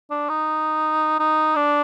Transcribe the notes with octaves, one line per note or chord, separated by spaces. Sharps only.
D4
D#4
D#4
D4